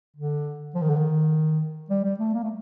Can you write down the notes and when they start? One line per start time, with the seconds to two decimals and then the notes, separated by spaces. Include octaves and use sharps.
0.17 D3
0.75 F3
0.82 D#3
0.90 D3
0.96 D#3
1.90 G3
2.04 G3
2.20 A3
2.34 A#3
2.44 A3